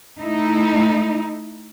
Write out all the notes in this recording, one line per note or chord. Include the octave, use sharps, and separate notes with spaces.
A3 D#4 E4